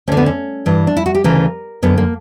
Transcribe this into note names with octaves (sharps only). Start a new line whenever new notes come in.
D2 D3 C#4
B3
C#4
G2 E3
D4
E4
F#4
G4
D2 C#3 E3 A#4
F#2 D3 B3
A#3